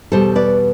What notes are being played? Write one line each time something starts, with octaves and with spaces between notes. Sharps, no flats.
E2 B2 G3 A4 C5
B4 D5